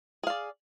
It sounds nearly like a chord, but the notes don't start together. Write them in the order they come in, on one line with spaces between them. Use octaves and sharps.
G#4 F5 D5